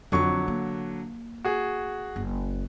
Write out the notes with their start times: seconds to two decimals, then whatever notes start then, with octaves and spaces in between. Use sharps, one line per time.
0.12 F2 D3 F#3 C4 C#6
0.48 A#3
1.45 F#4 G#4
2.16 F#1